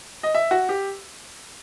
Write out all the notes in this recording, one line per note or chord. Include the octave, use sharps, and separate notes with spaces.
D#5
E5
F#4
G4